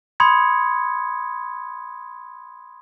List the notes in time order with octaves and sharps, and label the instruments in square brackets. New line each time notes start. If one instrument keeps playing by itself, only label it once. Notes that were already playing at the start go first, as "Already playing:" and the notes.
[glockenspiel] B5 C6 D#6 G#6 C#7